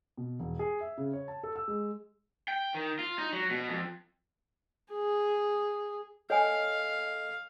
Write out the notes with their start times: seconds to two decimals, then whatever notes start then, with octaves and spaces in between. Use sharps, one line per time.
0.17 B2
0.40 E1
0.59 G#4
0.80 E5
0.98 C#3
1.13 C#5
1.28 A5
1.43 A4
1.56 E6
1.68 G#3
2.48 G5
2.74 D#3
2.99 F4
3.18 D#4
3.33 F#3
3.50 B2
3.69 F2
4.93 G#4
6.30 A4 C#5 D#5 F5 G#5